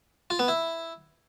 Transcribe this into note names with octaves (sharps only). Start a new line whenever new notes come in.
F4
B3
E4